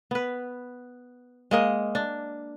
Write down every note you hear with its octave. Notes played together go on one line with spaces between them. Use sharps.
B3 B4
G#3 A#3 D#5
D4